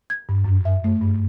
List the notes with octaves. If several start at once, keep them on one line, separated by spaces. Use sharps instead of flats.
G#6
G2
F#2
E5
A3
G2